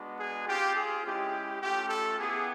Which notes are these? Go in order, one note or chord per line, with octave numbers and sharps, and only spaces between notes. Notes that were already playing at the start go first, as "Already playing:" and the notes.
Already playing: G#3 B3 D4 F#4
G#4
C4 F4 G4
G#4
G#3 C#4 E4 G4
A3 C#4 F4 G4
A4
B3 E4 G4 G#4